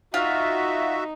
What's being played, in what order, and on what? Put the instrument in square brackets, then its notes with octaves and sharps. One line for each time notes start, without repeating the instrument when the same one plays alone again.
[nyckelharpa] D#4 [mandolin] F4 [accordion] F#4 E5